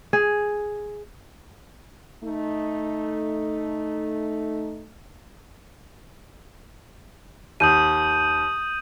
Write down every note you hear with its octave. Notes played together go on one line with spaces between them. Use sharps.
G#4
A3 D#4
D#2 D#6 G6 D#7